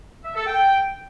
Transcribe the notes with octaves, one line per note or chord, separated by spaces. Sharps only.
E5
A4
G5